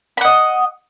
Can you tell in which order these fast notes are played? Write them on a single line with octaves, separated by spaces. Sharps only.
B5 F#5 D#5